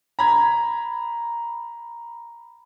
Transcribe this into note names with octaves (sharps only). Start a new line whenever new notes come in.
A#5 B5 G#6